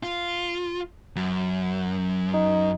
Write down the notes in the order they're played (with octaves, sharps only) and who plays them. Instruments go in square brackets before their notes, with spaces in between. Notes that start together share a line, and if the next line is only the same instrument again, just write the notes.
[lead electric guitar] F4
F#2
[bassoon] D#4